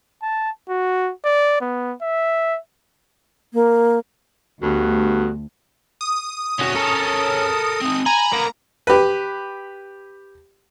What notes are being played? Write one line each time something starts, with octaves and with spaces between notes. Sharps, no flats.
A5
F#4
D5
B3
E5
A#3
D2 G2 A3 B3 F#4
D#6
C2 C#4 F#4 C#5
A4 A#4
C4 D#4
G#5 A#5 B5
A#3 B3
G4 B4